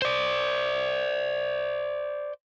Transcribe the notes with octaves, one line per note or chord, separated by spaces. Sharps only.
C5 D5